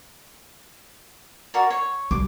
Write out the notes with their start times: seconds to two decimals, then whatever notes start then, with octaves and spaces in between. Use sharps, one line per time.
1.54 F#4 A#4 D5
1.70 C#5
2.11 C2 F2 D6